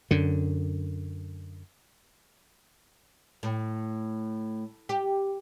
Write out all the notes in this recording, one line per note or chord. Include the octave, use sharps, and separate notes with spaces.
F#2 D3
A2
G4